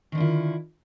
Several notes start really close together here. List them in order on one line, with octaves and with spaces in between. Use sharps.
D#3 D3 F4 E4